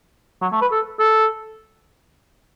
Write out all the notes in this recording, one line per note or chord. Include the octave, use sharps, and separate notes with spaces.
F#3
A3
B4
A4
A4